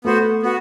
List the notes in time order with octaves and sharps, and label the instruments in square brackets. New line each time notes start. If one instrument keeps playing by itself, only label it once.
[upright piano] A3 [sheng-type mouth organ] B3 F#4 C5
[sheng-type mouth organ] B3 F#4